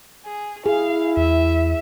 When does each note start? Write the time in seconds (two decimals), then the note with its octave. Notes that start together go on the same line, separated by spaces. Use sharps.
0.25 G#4
0.66 E4 G#4 F5
1.17 E2 E5